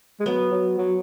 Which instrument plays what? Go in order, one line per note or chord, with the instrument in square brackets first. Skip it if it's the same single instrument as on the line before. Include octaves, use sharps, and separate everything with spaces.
[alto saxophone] G#3
[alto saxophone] F#3 [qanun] B3
[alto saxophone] F#3
F#3